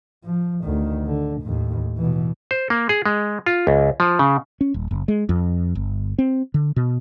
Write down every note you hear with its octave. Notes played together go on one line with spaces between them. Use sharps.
F3
D2 D#3
D3
D#2 A2
B2 E3
C5
A#3
G#4
G#3
F4
C#2
F3
C#3
C#4
D#1
F#1
G#3
F2
G1
C4
D3
B2